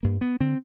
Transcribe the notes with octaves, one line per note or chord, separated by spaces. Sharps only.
G2 A#3
B3
D3 C4